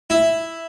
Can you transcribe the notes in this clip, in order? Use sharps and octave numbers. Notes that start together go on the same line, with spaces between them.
E4